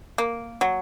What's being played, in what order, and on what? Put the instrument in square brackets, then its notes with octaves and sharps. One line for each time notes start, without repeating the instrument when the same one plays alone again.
[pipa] A#3
F#3